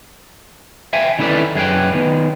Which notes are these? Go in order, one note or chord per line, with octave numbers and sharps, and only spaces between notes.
E5 G5 G#5
D#3 C#4 E4 A4 B4 D5
F#2 G#4 B4 G5
D#3 B3